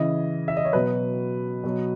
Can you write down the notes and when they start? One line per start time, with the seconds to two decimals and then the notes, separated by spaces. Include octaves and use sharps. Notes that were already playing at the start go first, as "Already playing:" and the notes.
Already playing: C#3 E3 D#5
0.48 E5
0.57 D#5
0.65 C#5
0.73 B2 F#3 B4
1.64 B2 F#3